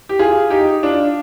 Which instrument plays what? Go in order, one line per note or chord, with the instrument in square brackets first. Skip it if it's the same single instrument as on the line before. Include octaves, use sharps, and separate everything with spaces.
[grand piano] G4
F4 G#4
D#4 G4
D4 F4